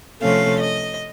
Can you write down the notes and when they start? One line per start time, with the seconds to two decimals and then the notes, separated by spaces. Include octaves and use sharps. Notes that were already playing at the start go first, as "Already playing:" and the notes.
0.22 C3 F3 A3 C#4 F5
0.61 D#5